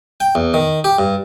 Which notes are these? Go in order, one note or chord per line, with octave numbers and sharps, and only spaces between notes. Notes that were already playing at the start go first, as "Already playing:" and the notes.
G5
E2
D#3
G4
G2